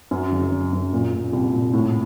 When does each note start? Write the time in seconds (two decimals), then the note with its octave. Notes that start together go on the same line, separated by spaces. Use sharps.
0.11 F#2
0.32 F#1
0.52 F#1
0.73 F#2
0.93 A#2
1.13 A#2
1.33 C2
1.54 A#2
1.74 A2